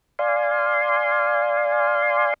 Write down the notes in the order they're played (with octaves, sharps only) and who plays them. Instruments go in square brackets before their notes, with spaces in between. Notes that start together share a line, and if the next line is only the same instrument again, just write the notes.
[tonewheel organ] D5 F5 G#5 C6